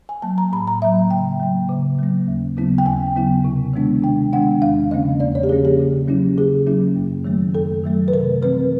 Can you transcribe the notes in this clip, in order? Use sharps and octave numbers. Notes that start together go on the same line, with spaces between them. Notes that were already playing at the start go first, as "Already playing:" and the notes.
G#5
F#3 A#3 A5
A#5
A2 B5
A#5
F#3 A#3 E5
C#3 G5
F#3 A#3
C#3
F#3 A#3
D#2
C#3 F#3 B3 E4
G5
D#2 G#5
C#3 F#3 B3 E4
C3
D#3 G#3 B3 D4
C3 G5
D#3 G#3 B3 D4 F#5
E2 F5
C#3 F3 A#3 C#4 D#5
E2 D5
C#5
G4
C#3 F3 A#3 C#4 G#4
G4
C#3
F#3 A#3 C#4 E4
C#3 G#4
F#3 A#3 C#4 E4
F#2
D#3 F#3 A3
F#2 A4
D#3 F#3 A3
B4
C3 A#4
E3 G3 C4 B4